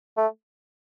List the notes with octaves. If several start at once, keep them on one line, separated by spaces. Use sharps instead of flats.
A3